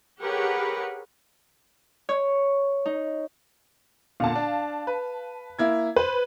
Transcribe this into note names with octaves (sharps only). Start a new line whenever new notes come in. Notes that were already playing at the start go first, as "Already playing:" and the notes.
G4 G#4 A#4 B4 C#5 F#5
C#5
D#4
A#2 D3 A#3 F5 A5
D4
B4
A#3 E4 G#6
B4 C5